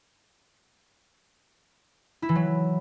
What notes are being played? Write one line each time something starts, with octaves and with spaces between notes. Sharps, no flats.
E4
E3
F#3